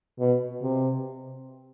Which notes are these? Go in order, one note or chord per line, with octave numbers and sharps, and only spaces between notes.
B2
C3